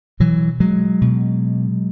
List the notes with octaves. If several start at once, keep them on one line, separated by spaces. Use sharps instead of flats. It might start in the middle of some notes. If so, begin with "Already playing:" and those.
B2 E3 F#3
F#3 G#3
B2